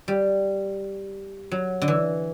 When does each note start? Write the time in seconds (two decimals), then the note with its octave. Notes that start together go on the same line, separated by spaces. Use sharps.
0.08 G3
1.51 F#3
1.82 D3
1.88 E3